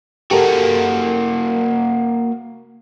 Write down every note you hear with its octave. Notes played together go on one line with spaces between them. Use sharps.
A#3 F#4 G4 A4 A#4